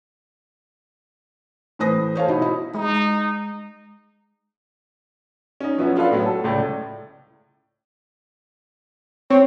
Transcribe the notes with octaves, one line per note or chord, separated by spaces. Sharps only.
A2 E3 B4 C5 D#6 A#6
C5 C#5 F5 A5
B2 D#4 E4
E4
G#3 D#4
C#4 D#4
F#2 F3 B3 C#4 E4
D4 F4 A4 B4 F5
A2 F#3 B3
A4
C#2 A2 D5
C4 C#5